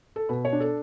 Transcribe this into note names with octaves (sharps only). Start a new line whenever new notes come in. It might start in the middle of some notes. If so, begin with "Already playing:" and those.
A4
B2 B4
C#5
D4
A4